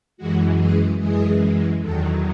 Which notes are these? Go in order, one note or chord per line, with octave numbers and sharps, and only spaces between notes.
F#2 E3 G#3 F#4
G#4
F#2 E3 G#3 G#4
E2 D#3 F#3 A4